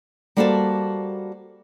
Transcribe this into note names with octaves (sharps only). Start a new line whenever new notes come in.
G3 A#3 F#4 A4 C5 A5